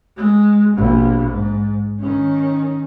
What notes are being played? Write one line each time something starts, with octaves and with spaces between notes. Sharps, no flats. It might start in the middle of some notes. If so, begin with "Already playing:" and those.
G#3
A#1 B2
G#2
D#3 C#4